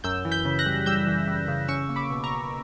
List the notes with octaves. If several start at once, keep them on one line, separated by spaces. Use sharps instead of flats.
F#2 E6 G6
E3
G6 B6
C#3
F#6 A#6
G3
G3 E6 G6
E3
G3
C#3
C#4 C#6 E6
A#3
B5 D6
B2
A#5 C#6
B2